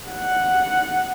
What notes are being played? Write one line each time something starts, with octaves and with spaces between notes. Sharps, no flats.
F#5